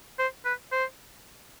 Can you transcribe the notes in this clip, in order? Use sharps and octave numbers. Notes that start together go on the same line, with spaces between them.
C5
B4
C5